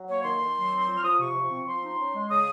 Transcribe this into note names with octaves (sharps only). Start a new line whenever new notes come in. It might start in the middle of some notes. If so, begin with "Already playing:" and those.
Already playing: F#3
A#3 C#5
D#3 C6
D#3
F#3
C4
F3
F6
F3 D#6
C3 C#6
F3
C4
F3 C6
D#4
C#4
G#3
C#3 D#6